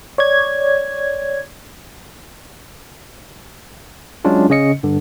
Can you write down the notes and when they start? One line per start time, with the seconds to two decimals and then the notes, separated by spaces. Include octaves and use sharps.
0.18 C#5 D5 G#6
4.25 F#3 G#3 C#4 D4 F4
4.49 C#3 C#4 D#5 C#7
4.83 G2 D3